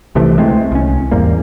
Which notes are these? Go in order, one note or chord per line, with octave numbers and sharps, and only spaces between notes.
C2 C3 E3 A3
D2 G#3 A3 C4
C2 C#4
E2 G#2 G3 A#3